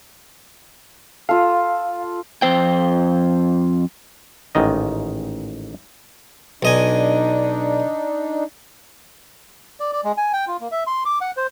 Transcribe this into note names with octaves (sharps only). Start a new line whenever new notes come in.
F4 A4 F5
F2 C5 G5
A1 G#2 D#3 D#5
B1 D4 D#4 D#5 G#5
D5
D5
G#3
G#5
G5
F4
A#3
E5
C6
D6
F#5
C5